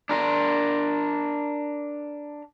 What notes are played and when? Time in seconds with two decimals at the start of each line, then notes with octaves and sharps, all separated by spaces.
0.09 D4 A#4